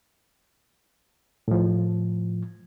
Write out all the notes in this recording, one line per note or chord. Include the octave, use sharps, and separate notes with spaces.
A2 F3